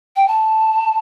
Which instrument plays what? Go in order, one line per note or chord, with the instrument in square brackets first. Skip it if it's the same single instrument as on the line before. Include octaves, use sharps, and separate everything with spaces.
[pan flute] G5
A5